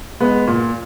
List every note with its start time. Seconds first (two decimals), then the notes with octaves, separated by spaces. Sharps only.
0.20 G#3 B3
0.47 A#2